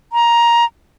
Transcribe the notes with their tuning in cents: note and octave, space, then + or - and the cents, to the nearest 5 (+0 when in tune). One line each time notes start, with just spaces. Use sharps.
A#5 +10